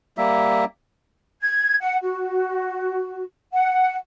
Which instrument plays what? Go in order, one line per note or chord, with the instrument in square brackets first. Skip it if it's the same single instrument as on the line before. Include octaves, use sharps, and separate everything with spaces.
[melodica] G3 A#3 E5
[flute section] G#6
F#5
F#4
F#5